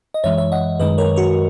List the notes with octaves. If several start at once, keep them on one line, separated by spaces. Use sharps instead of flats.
D#5
F#2 E3 G#3 C#5 E5
C#5 E5
D#5 F#5
F#2 D#3 G#3 B4 D#5
A#4 C#5
F#4 A#4